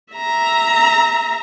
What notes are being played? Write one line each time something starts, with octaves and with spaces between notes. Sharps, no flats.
E5 A#5